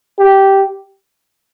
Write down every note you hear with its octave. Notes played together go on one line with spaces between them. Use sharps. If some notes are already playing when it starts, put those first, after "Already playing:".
G4